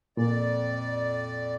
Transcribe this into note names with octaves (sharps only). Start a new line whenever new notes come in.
F2 A#2 D5